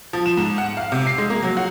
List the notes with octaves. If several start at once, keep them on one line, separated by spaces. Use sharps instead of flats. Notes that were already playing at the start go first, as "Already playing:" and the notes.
F3
E7
G#2
F#5
F5
C3
C7
G#3
A#3
F#3
F#4